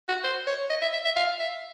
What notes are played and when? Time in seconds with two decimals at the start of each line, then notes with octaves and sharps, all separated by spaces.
0.09 F#4
0.24 C5
0.47 C#5
0.70 D#5
0.82 E5
0.93 E5
1.05 E5
1.16 F5
1.40 E5